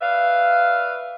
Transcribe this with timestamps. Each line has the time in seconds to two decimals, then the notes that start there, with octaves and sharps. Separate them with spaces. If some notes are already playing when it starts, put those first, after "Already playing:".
0.01 B4 D5 E5 F5